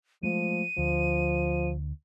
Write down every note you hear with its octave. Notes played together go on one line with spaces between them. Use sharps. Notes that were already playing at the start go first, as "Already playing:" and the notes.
F3 G#3 A3 D#7
D2 F3